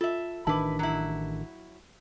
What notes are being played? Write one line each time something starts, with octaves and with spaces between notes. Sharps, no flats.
F4 A4 E5
A1 D#3 D4 E4 B4 A5 D6
F#3 E4